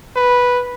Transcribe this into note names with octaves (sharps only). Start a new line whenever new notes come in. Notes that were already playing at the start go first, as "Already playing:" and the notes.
B4